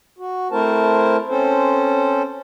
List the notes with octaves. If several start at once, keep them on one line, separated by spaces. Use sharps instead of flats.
F#4
A3 C4 E4 A#4 C5 A5
C4 C#4 A4 C5